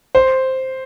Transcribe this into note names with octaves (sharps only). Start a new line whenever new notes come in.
C5